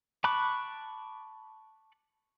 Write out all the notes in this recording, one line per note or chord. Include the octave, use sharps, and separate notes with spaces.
A5 B5 C#6 D6 F#6